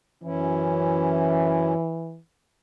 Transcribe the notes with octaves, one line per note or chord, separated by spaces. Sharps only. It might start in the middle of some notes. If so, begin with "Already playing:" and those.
F#2 E3 C#4 E4